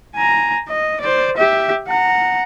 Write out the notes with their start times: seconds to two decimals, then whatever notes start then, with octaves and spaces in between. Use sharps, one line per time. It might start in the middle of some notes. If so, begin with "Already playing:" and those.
0.15 G#5 A#5
0.69 D#5
1.01 C5 D5
1.37 G4 E5
1.87 F#5 A#5